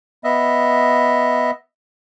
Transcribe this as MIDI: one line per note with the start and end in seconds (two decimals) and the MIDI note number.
0.24 1.51 59
0.24 1.51 75
0.24 1.51 76